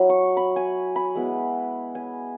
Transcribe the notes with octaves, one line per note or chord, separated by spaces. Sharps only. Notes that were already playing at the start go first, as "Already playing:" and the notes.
Already playing: F#3 E4 B5
C#6
B5
G#5
B5
G#3 B3 E4
G#5